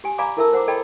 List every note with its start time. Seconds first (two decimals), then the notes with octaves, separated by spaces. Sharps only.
0.04 G4 G#5
0.18 D5 F5 G#5 A#5 B5 D6
0.37 E4 A4 A#4 E5 A5 E6
0.53 C5 F#5 A#5 D6
0.68 A4 D5 D#5 G5 B5